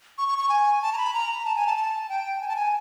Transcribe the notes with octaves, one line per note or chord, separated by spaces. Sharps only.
C#6
C#6
C#6
G#5
A5
A#5
B5
A#5
A5
G#5
A5
A5
G5
G#5
A5
G#5